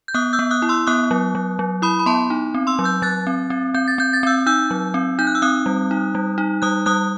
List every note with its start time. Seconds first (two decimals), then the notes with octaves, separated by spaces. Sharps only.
0.08 G6
0.14 B3 D#6 F#6
0.33 E6 G6
0.39 B3
0.51 D#6 F#6
0.62 E4
0.69 C6 E6
0.87 B3 D#6 F#6
1.11 F#3
1.35 F#3
1.59 F#3
1.82 E4 B5 D#6
1.99 B5
2.06 B3 A5 C6
2.30 D#4
2.54 C4
2.67 C6 E6
2.79 F#3
2.84 E6 G6
3.02 F#3 F#6 A6
3.27 C4
3.50 C4
3.74 C4 G6
3.88 A6
3.98 C4 G6
4.13 A6
4.23 C4 E6 G6
4.46 D#4 E6 G6
4.71 F#3
4.94 C4
5.19 D#4 G6
5.27 F#6
5.35 E6
5.42 C4 D#6 F#6
5.66 G3
5.91 D#4
6.15 G3
6.38 D#4
6.62 G3 D#6 F#6
6.86 G3 D#6 F#6